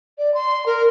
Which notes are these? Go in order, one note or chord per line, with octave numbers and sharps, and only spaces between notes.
D5
C6
A#4